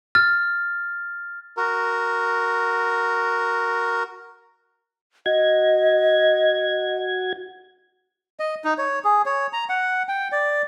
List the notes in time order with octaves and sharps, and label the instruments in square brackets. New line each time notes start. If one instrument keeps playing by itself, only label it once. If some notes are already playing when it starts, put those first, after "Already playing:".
[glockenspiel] F6 A6
[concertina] F#4 A#4
[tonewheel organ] F#4 G#6 [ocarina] D#5
[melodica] D#5
D#4
C#5
G#4
C#5
A#5
F#5
G5
D5